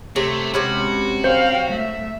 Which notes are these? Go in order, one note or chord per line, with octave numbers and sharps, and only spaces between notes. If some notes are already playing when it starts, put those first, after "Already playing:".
C3 A3 C#5
C3 G#3 C#4 F#4 B4
C5 C#5 F5 G5
A3 E5